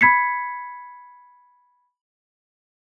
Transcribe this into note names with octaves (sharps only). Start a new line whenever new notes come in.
B5 G#6 B6 C#7